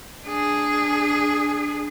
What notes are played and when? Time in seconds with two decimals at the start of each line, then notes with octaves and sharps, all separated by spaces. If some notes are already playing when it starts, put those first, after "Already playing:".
0.24 D4 G#4